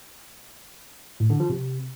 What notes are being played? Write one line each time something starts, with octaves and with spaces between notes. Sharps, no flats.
A2
D3
F3
C3